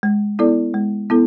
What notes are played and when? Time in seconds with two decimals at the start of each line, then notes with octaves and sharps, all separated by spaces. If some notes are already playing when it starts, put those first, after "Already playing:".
0.03 G#3
0.39 B3 E4 A4 D5
0.74 G#3
1.10 B3 E4 A4